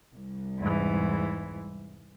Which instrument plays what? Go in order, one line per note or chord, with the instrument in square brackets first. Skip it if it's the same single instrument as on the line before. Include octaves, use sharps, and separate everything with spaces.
[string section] C2
[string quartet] E2 G#2 E3